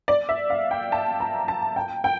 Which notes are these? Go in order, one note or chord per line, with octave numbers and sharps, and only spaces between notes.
D5
E5
F5
G5
A5
A#5
A5
G5
G5